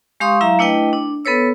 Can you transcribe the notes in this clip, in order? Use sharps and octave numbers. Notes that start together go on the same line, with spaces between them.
G#3 G4 F5 C6 C#6 D#6
F#3 E4 E5 F5 A#5
A3 D4 E4 B4 D#5 G5
D4
B3 A4 B4 C#5 E6